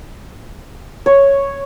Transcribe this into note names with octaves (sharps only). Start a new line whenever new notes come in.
C#5